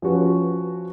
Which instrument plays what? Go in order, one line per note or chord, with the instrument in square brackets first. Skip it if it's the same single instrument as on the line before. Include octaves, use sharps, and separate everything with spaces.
[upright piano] F3 C#4 F#4 B4